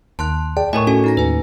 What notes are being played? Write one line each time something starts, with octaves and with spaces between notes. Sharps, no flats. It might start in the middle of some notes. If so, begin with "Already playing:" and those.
D#2 A5 C6 F#6
G#4 D5 G5 A5
A2 A#4 C#5 D#5 G#5 C#6
C#4 F#4 A4 G#5
D#4 A#5 A#6
D#2 B4 G#5